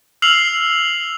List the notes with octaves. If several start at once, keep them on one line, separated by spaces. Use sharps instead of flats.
E6 F6 C7 F7 F#7